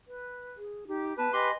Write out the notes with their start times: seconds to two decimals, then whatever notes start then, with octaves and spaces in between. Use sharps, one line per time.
0.08 B4
0.57 G#4
0.88 D#4 G4
1.18 B3 B4 A5
1.33 G4 D#5 G#5 B5 C6